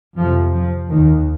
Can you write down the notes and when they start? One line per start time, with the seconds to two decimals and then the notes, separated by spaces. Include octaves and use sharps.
0.18 F2 C3 F3
0.53 F3
0.89 D#2 D#3